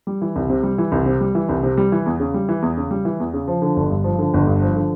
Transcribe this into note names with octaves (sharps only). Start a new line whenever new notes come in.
G3
E3
C2
C3
G3
E3
C2
C3
G3
E3
C2
C3
G3
E3
E2
C#3
G3
E3
E2
C#3
G3
E3
E2
C#3
F3
D3
G1
G2
F3
D3
G1
G2
F3
D3